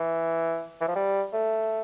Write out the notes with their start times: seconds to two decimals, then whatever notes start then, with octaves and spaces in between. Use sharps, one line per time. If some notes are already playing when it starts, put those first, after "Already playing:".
Already playing: E3
0.81 E3
0.88 F3
0.95 G3
1.33 A3